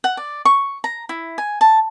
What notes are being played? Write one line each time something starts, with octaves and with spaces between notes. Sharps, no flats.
F#5
D5
C#6
A#5
E4
G#5
A5